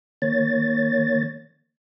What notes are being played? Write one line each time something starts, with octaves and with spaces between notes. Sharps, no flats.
D#3 A#3 C#5 A6